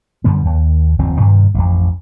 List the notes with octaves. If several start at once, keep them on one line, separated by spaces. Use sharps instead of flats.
F#2 D3 G3 B3
D#2
F#1 D#2 F3 C4
G2 C3 D#3
A1 F2